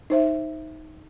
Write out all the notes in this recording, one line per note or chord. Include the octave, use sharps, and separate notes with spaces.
D#4 C5 E5